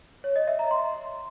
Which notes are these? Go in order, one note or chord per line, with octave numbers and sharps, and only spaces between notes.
C#5
D#5
E5
A#5
C6